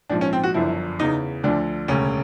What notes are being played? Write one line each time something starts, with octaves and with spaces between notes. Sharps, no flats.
A#1 G#2 F3 D4
C#4
C4
F#4
G1 F#2 D3 F3 E4
E2 C#3 E3 D#4
D2 D3 F3 D4
E1 D2 C#3 C#4